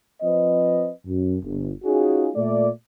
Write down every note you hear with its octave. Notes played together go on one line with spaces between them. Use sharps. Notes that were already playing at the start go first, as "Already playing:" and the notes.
F3 C4 B4 D#5
F#2
G1
C#4 D#4 F4 F#4 G#4
A#2 A3 D5